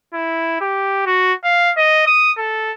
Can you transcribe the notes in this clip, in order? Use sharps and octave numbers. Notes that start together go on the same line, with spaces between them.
E4
G4
F#4
F5
D#5
D#6
A4